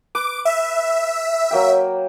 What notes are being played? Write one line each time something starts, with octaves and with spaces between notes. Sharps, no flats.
B4 D6
E5
F#3 A#3 G5